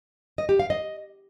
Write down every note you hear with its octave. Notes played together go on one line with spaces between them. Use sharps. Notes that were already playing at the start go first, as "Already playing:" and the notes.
D#5
G4
F5
D#5